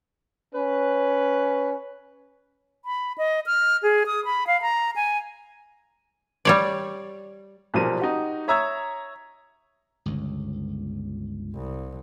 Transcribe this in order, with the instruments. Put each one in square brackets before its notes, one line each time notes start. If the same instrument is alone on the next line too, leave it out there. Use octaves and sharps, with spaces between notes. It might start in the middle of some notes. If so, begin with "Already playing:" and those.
[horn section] C#4 B4
[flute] B5
D#5
F6
G#4
D#6
B5
F5
A#5
G#5
[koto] G3 C#5 D5
[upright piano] B1 A#2 F3 G3 A#3 D#7
D#4 F#4 G4
C#5 E5 A#5 D#6 E6 G#6
[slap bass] G1 C#2
[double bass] C2